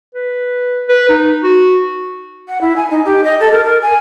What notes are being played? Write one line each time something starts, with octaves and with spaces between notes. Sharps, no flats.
B4
B4
D#4
F#4
F#5
E4
G#5
D#4
G4
D#5
A4
A#4
A#4
G#5